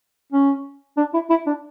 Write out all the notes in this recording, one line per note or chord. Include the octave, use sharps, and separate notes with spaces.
C#4
D4
E4
E4
D4